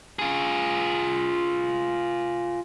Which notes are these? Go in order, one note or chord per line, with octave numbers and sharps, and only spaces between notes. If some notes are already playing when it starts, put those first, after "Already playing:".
F4 G#4